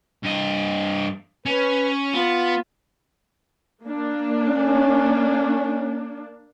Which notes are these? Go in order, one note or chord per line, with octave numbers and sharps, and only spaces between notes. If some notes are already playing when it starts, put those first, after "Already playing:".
G2 D#5
C#4 B4
B3 F4
A#3 D4
C#4